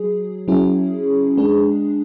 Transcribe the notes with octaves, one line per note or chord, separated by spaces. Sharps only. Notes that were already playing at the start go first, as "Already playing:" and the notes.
Already playing: F#3 G#4
F#3 C#4 E4 G#4
G#3 D4 G#4